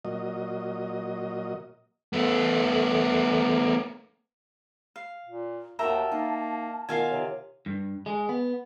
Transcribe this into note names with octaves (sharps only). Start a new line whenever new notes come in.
A#2 F#3 D#5
A3 B3
F5
A#2
D#2 F#4 A#4 E5 G5 A5 A#5
A#3 D#4
B2 D#3 F4 F5 G#5
C3 C#5
G2
G#3
B3